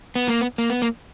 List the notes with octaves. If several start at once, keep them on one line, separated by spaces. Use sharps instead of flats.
B3
A#3
B3
A#3
B3
A#3